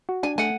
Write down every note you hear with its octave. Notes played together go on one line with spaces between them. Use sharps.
F#4
D4 G#5
A3 F#5 G#5